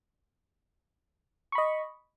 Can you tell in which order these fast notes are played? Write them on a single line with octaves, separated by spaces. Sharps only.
C#6 B5 D#5